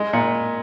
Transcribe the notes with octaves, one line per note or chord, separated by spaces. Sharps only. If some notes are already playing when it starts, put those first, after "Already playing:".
Already playing: G#3
A#2